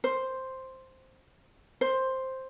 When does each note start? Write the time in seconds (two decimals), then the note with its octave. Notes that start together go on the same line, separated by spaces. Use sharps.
0.04 C5
1.81 C5